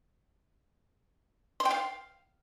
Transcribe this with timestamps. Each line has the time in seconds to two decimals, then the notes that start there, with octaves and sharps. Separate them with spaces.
1.60 C6
1.65 G5
1.71 F5